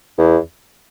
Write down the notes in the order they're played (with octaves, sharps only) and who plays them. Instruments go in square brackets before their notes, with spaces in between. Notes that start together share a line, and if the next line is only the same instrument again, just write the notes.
[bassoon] E2